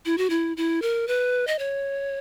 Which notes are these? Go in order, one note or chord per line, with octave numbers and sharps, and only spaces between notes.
E4
F#4
E4
E4
A#4
B4
D#5
C#5